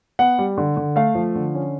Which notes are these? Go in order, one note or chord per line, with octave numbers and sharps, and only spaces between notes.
B3 F#5
G3
D3
D3
A3 F5
F3
D3
C#4